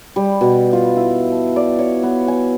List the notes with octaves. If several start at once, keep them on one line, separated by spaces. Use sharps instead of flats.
G3
B2
F4
E4
A5
D5
C#5
B3
G#5